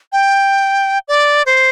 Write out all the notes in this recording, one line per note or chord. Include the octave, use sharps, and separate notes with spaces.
G5
D5
C5